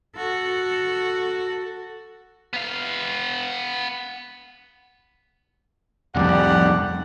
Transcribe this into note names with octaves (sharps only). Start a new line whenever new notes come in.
F#4 A4
B3 F5
C2 F2 G4 D5 F#5